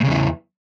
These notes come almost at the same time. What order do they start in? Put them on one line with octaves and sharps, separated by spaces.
A2 C#3 E2 E3